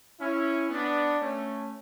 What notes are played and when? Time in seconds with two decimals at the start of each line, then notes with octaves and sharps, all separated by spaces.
0.20 C#4 E4
0.70 B3 D4
1.20 A3 C#4